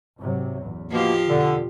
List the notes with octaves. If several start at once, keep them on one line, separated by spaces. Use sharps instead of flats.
G#2 C3 F#3
A1 E2
B2 F3 A#3 F4 G4
F2 B2 D3